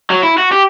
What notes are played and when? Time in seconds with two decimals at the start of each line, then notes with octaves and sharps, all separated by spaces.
0.10 F#3
0.23 E4
0.38 F#4
0.52 G4